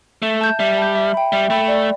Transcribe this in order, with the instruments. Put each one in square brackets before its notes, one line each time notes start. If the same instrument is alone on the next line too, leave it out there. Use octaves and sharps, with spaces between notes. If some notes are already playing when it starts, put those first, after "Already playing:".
[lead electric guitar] A3 [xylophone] E5
[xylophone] A5 G6
[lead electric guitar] G3 [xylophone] E5
[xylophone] A5 G6
E5
G5 B5
[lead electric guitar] G3 [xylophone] E5
[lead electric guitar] A3 [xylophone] G5 B5
[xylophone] D5